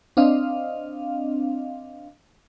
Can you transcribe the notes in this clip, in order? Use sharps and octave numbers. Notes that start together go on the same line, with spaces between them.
C4 D4 D#5 F5